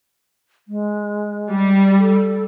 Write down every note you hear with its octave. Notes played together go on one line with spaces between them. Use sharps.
G#3
G3
A4